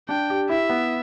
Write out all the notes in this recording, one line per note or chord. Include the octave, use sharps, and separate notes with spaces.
D4 G5
G4
E4 E5
B3